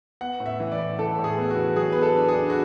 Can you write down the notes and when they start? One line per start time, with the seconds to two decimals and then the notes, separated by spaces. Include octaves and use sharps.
0.21 B3 F#5
0.40 A2
0.46 E5
0.60 E3
0.72 D5
0.79 A2
0.99 E3 A4
1.18 A2
1.24 G#4
1.38 B3
1.50 F#4
1.56 E3
1.76 F#3 G#4
1.92 B3 B4
2.02 A4
2.16 D4
2.28 G#4
2.34 D4
2.50 F#4